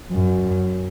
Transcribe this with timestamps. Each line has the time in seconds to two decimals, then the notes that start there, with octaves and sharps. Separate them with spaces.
0.12 F#2